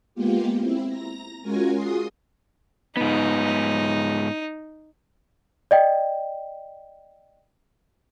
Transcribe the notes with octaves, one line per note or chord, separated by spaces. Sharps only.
G#3 A#3 B3 F4 G4
C4 E4
A#5 A#6
G#3 C#4 F4 F#4 A#4 G#5
F4 F#4 G#4 C6 D#6
G#2 B3 D#4
D5 D#5 G5